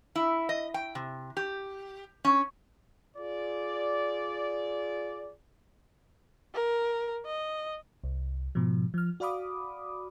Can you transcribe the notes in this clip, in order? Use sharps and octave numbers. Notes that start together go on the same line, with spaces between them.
E4
D#5
G5
C3
G4
C#4
F4 G#4 D5
A#4
D#5
C2
G#2 B2 F3
F3 F6
F#4 D5 F5 B5 D6 D#6